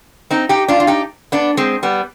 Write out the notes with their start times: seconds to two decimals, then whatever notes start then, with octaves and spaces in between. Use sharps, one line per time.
0.30 C4 D#4
0.49 D#4 G4
0.68 D4 F4
0.80 F4
0.87 D#4 G4
1.32 B3 D4
1.57 G#3 C4
1.83 G3 B3